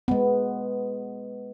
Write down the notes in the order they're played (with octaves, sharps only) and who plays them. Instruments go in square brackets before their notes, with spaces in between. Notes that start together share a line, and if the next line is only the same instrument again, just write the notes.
[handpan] G#3 B3